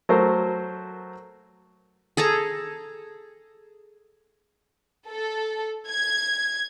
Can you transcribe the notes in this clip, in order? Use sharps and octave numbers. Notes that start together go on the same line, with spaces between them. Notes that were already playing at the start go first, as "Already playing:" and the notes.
F#3 A3 A#4 C5
G#4 A4 A5 A#5
A4
G#6